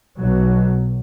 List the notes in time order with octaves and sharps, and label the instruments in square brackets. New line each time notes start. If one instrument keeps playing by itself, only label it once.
[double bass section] B1 B2 F#3